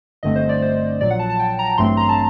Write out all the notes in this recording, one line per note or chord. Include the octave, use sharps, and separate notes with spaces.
G1 G2 D3 A3 C4 D#5
C5
D5
C5
A#1 A#2 F#3 D5
F#5
A5
A5
G5
A#5
A1 G2 F#3 A3 C4 C6
A#5
A5